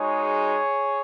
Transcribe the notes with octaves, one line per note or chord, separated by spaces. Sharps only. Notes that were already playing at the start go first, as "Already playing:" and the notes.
Already playing: G#3 D#4 F#4 G#4 C#5